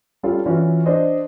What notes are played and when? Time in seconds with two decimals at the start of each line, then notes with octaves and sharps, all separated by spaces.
0.23 G3 C#4 F4 A4
0.46 E3 C#4 F4 F#4
0.86 D4 C5 D#5